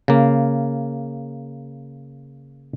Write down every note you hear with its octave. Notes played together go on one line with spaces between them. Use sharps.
C#3 A#3